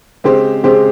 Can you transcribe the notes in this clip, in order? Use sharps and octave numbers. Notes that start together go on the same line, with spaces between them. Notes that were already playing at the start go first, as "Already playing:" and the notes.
C#3 G#3 C4 G4 C5
C#3 G#3 C4 G4 C5